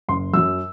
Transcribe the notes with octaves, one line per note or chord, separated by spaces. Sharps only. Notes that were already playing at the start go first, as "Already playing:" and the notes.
F#1 C6
F#2 F#3 E6